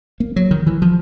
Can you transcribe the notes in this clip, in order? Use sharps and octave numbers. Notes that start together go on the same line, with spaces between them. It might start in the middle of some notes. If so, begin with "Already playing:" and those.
A#3
F#3
D#3
E3
F3